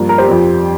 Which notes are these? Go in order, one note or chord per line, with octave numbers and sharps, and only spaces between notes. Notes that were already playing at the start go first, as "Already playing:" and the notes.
Already playing: G2 F3 A#3
A#4
G4 C5
F2 F3 C4